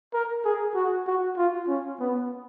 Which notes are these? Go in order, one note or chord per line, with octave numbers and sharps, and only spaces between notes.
A#4
G#4
F#4
F#4
F4
C#4
B3